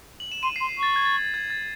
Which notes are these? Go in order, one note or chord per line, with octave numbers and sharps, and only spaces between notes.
F#7
E7
C6 D#7
C7
C6
C7
C#6 A6
G#6
A6
G#6
A6
G#6
A6